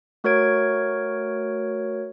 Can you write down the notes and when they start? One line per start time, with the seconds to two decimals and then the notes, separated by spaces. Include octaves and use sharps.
0.24 A3 F#4 A#4 C#5 G#6 D7